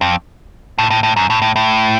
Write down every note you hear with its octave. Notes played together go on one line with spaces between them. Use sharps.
F2
A2
A2
A2
F#2
A2
A2
A2